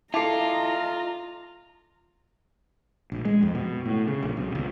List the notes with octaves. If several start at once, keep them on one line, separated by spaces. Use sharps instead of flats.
E4 F4 A4 D#5 A5 A#5 D6 C7
A#1
G#3
F2
B2
A2
C#3
A#1
B1
C#2